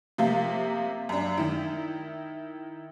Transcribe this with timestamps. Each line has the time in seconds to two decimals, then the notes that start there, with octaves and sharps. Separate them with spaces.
0.18 C3 F3 A#3 E5
1.09 F#2 D4
1.38 D#3 E4